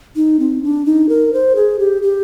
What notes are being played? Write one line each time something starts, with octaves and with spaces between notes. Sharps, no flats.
D#4
C4
D4
D#4
A#4
C5
G#4
G4
G4